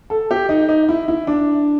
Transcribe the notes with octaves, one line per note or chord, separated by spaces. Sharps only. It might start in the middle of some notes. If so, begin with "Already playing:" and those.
A4
G4
D#4
D#4
E4
E4
D4